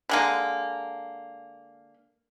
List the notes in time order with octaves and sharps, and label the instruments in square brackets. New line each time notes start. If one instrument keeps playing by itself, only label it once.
[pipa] D3 G#3 A#3